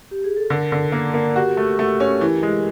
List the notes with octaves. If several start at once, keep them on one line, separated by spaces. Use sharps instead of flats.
G4
G#4
A4
D3 A#4
D3
A#3
A#3
F#4 G4
A3
A3
C#4
E3
G#3